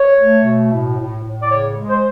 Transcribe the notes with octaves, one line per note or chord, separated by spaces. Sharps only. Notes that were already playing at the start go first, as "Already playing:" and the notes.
Already playing: C#5
A3
B2
A2
A2
A2
D5
C#3 C#5
G#3
C5